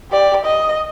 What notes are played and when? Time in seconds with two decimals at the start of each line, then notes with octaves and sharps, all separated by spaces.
0.11 G4 D5
0.45 D#5